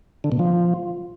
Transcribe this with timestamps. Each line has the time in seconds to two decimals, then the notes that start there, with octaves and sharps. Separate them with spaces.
0.24 D3
0.32 B2
0.39 F3